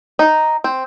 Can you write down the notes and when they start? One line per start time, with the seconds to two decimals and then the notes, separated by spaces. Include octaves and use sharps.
0.19 D#4
0.64 C4